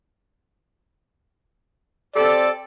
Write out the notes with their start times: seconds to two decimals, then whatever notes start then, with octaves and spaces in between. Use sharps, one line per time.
2.16 C4 G4 A4 D5